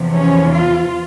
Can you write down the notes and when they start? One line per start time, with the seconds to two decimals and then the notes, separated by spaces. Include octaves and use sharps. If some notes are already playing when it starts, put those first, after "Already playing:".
Already playing: E2 C3 F3
0.14 C#4
0.53 F4